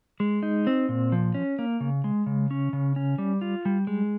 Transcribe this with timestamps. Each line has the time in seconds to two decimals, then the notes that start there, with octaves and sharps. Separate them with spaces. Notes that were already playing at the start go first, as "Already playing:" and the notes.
0.20 G#3
0.43 D#4
0.67 C4
0.89 A#2
1.12 F3
1.35 C#4
1.59 A#3
1.80 C#3
2.04 G#3
2.26 C#3
2.51 C#4
2.73 C#3
2.96 C#4
3.18 G3
3.42 F4
3.65 G3
3.87 G#3